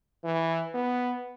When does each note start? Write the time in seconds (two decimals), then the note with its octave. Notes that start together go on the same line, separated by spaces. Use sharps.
0.24 E3
0.74 B3